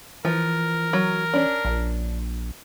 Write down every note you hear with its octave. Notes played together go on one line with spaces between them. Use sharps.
E3 F3 A#4
F#3
C#4 D4
A#1